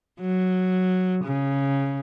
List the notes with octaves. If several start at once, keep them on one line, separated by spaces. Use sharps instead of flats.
F#3
C#3